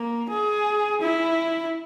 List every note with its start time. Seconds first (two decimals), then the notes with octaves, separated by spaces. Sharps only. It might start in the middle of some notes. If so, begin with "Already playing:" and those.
Already playing: A#3
0.30 G#4
1.02 E4